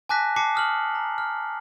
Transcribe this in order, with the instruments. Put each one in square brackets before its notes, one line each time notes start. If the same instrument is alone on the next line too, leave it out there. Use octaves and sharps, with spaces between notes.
[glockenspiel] G#5 A5 D6 F#6 A#6 B6
A5 D6 C7 C#7
D#6 F6 F#7
A#5
F6